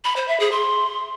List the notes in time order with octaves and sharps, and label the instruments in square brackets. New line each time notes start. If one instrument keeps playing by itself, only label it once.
[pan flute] B5
C5
E5
G#4
C6